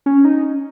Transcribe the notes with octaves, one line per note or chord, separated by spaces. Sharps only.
C#4
D#4